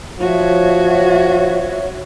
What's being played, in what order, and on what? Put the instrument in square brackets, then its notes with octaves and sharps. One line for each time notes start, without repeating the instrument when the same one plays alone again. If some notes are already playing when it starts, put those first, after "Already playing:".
[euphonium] F3 [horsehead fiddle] F#4 [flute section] C#5 E5